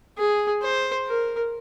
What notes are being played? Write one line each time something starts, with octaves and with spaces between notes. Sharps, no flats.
G#4
C5
A#4